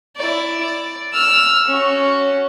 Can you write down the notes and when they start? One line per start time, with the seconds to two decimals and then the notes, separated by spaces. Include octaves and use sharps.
0.17 E4 D5
0.61 D5
1.13 E6 F6
1.68 C#4 F#4